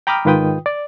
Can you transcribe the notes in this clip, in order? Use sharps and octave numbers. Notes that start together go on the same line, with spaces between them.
G5 A#5 B5 D6 D#6 F6
G#2 D#3 F4 B4 G5 D#6
D5